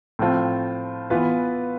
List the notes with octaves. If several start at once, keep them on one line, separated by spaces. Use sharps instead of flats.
A2 F3 C4 F4
E3 B3 F4 B4